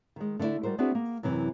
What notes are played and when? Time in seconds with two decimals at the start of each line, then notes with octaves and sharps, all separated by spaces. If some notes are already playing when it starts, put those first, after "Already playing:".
0.16 D#3 G#3
0.39 D3 A3 B3 D4 E4
0.63 G3 F#4 A#4 C5
0.79 B3 C4 D4 E4 F#4 G#4
0.95 A#3
1.23 F#2 C3 E3